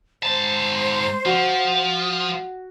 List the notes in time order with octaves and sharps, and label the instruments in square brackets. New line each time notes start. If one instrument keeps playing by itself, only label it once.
[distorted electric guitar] G#2 A5 [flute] C5
[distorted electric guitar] F3 [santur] F#4